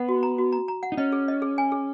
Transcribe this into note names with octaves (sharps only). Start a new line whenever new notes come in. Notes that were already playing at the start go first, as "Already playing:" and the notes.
Already playing: B3 F#5
F#4
A#5
F#4
A#5
A#5
F#5
D#4
C#4 D#5
G#4
D#5
G#4
G#5
G#4